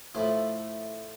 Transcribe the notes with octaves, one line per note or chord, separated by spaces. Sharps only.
A2 F3 A3 E4